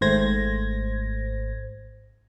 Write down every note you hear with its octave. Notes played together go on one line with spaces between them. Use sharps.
G#1 G#2 A3 C5 G#6 A#6